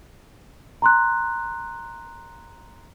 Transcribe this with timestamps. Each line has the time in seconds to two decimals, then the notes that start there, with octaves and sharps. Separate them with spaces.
0.82 A#5 C6 F#6